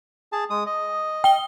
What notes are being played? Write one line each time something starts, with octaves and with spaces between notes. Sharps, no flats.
G#4 A5
G#3 D#6
D#5
G5 G7